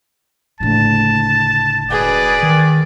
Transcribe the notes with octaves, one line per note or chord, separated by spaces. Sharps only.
F#1 A2 D3 A5
E1 G#4 B4 D5
D#3